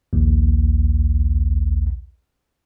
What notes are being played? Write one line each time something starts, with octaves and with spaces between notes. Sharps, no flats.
A#1 D#2